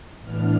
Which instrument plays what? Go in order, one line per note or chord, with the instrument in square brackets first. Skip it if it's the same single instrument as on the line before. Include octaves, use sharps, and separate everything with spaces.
[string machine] A2 E3 B3 D4 F6